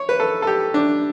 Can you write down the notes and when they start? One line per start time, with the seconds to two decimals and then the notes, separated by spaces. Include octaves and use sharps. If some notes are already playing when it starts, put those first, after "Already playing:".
Already playing: C#5
0.09 B4
0.20 A4
0.42 A4
0.47 G4
0.74 D4